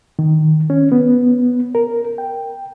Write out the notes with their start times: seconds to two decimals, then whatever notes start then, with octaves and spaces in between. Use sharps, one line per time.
0.19 D#3
0.70 C#4
0.92 B3
1.75 A#4
2.18 G5